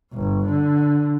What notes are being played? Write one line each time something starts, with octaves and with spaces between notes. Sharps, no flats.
G1
D3